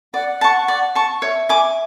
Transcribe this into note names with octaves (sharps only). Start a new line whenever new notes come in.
D5 F#5
A5 C#6
D5
A5 C#6
C#5 E5
G#5 D6